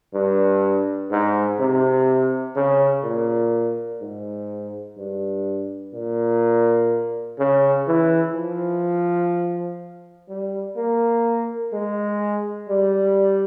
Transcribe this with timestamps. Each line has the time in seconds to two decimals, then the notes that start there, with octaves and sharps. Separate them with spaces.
0.14 G2
1.12 G#2
1.59 C3
2.56 C#3
3.04 A#2
4.01 G#2
4.98 G2
5.94 A#2
7.39 C#3
7.88 E3
8.35 F3
10.29 G3
10.77 A#3
11.73 G#3
12.70 G3